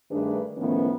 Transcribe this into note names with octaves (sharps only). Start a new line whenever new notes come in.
G2 D#3 A3 D4 G#4 B4
A2 D#3 F3 B3 C#4